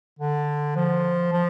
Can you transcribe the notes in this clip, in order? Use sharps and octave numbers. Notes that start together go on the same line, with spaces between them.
D3
F3
F3